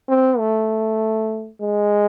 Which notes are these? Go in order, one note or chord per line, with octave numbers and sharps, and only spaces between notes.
C4
A3
G#3